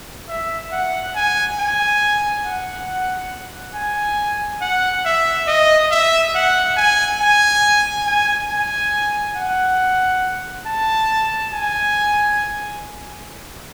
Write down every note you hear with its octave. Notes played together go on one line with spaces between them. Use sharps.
E5
F#5
G#5
G#5
F#5
G#5
F#5
E5
D#5
E5
F#5
G#5
G#5
G#5
G#5
F#5
A5
G#5